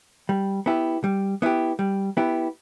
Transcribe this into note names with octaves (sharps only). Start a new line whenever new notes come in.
G3
B3 E4 G4
G3
B3 E4 G4
G3
B3 E4 G4